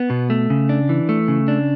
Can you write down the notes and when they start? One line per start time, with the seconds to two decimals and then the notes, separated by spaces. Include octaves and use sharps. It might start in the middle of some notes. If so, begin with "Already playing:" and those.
Already playing: B3
0.10 B2
0.30 A3
0.50 C#3
0.69 D4
0.89 E3
1.09 A3
1.28 C#3
1.48 D4